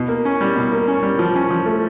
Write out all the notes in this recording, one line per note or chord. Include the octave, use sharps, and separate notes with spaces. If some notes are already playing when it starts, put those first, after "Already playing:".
Already playing: B2
A#3
C#4
G3
B2
A#3
C#4
G3
F3
C#4
F3
A3